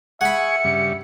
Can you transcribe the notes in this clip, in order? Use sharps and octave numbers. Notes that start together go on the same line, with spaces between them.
G#4 E5 F#5 G#5 B5 C#6 C#7
G2 C#3 G3